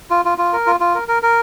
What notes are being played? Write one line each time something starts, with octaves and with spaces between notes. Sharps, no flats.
F4
F4
F4
A#4
F4
F4
A#4
A#4
A#4